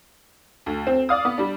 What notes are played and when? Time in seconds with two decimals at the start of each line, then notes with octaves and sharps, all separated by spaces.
0.66 D2
0.87 C4
1.09 D5 F5 D#6
1.25 B3
1.38 G3 D4